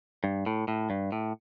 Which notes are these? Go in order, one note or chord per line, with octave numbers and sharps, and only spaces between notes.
G2
A2
A2
G2
A2